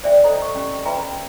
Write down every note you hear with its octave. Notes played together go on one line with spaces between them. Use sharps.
C5 D5 E5 G5
A4 C5 D#5 A#5
C#6
C#4 G4
F4 B4 E5 G5 A#5